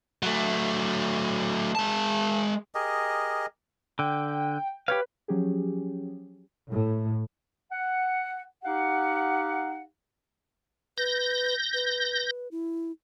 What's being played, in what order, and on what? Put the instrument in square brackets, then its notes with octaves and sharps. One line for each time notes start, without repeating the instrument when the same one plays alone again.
[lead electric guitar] F#3 A3
G#3 A5
[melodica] G4 G#4 A#4 D#5
[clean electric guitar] D3 [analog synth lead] G5
[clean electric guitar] G4 C#5 F5 [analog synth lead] B4
[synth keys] F3 F#3 C#4 G4 G#4
[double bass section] A2
[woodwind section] F#5
D#4 G4 F5 F#5
[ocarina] B4 [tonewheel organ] G6 A#6
[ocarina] B4
E4